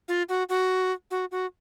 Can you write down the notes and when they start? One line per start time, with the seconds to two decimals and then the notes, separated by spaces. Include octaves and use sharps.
0.08 F4
0.29 F#4
0.49 F#4
1.11 F#4
1.31 F#4